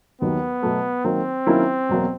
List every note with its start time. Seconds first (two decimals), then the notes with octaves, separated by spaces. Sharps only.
0.21 D#2 D#3 F#3 B3
0.63 B2 F#3 A3
1.04 D#3 F#3 A#3 C4
1.47 D#3 F#3 A#3 C#4 E4
1.89 E2 B2 F#3 A#3